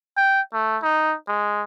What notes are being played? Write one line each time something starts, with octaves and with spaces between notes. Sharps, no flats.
G5
A3
D#4
G#3